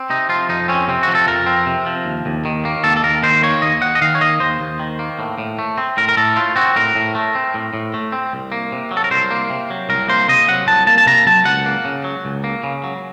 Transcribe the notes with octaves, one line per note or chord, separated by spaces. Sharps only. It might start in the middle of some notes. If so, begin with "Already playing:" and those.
Already playing: C4
C3 D#4
F3 F4
F2 D#4
C4 C#4
C3 C4
F3 F#4
A4
F2 A#4
C4
C3
F3
D#2
D#2
D#3
A#3
D#2 A4
A4
D#2 A#4
D#3 C5
A#3 C#5
D#2 D#5
D#2 F#5
D#5
D#3 F5
C#5
A#3 D#5
D#2 C5
D#2
D#3
A#3
A2
A2
A3
C4
A2 A#4
A#4
A2 A4
A3 F4
C4 F#4
A2 A#4
A2
A3
C4
A2
A2
A3
C4
C2
A#3
C3
F#3
A4
A#4
C2 C5
A#3
C3
F#3
C2 A#4
A#3 C5
C3 D#5
F#3 F#5
C2 A5
A#3 A5
A5
C3 A#5
F#3 A5
C#2 F#5
A#3
C#3
F#3
C#2
A#3
C#3
F#3